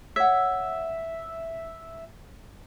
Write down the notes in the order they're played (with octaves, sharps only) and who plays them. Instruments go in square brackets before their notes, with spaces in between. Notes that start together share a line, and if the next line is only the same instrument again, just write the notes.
[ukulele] C#5 F#5 [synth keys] E5